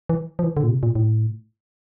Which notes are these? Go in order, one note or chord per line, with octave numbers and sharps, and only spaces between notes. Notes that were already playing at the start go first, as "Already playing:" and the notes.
E3
F3
E3
D3
A#2
C3
A#2
A2